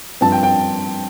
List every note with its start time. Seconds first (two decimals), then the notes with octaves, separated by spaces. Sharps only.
0.21 G2 F3 C4 A5
0.32 G5
0.43 G5